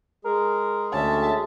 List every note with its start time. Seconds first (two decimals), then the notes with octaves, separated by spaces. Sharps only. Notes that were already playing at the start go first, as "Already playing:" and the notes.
0.25 G#3 G#4 A#4
0.92 D2 C#4 E5 A5